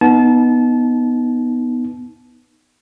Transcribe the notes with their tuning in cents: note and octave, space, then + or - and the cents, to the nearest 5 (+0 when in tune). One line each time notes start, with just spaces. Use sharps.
B3 +0 D#4 +0 A5 -30